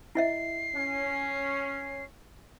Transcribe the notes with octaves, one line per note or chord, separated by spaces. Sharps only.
E4 D#5 E5 C7
C#4